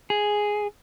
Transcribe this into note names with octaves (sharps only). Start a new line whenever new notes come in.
G#4